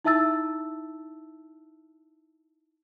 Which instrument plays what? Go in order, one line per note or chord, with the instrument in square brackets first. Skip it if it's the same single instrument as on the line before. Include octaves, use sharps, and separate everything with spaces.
[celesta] D#4 E4 E5 A5 E6 A6